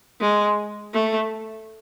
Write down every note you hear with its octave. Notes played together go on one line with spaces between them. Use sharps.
G#3
A3